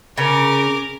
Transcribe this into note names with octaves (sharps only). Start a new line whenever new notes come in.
C#3 C#4 A#4 D6